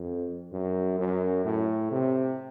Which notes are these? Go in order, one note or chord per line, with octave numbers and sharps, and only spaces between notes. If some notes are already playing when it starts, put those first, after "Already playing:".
Already playing: F2
F#2
F#2
A2
C3